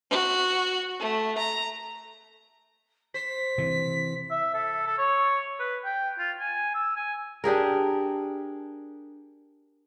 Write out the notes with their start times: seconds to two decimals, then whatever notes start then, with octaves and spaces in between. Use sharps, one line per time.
0.10 F#4
0.99 A3
1.38 A#5
3.14 C5 B6
3.58 C3 E3
4.30 E5
4.54 A4
4.87 A4
4.98 C#5
5.59 B4
5.85 G5
6.19 F4
6.40 G#5
6.74 E6
6.96 G#5
7.44 D4 G4 G#4 A#4